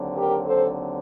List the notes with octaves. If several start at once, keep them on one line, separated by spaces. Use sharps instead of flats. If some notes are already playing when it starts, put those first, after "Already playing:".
Already playing: D#2 D3 F#3 C4
G4 A#4
A4 C5